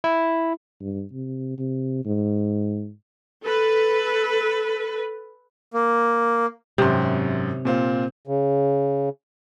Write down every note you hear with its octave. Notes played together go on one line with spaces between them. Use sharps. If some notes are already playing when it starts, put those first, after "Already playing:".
E4
G2
C3
C3
G#2
A4 B4
A#3
G#1 F#2 C3 C6
A#2 C4 F4
C#3